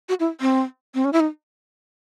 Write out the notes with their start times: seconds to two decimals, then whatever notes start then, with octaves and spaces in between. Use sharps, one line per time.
0.09 F#4
0.20 E4
0.41 C4
0.95 C4
1.05 C#4
1.13 E4
1.20 D#4